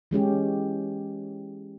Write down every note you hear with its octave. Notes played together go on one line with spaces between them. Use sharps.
E3 G#3 C#4 G4